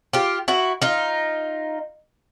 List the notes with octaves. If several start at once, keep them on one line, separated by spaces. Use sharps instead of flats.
F4 G4
E4 F#4
D#4 F4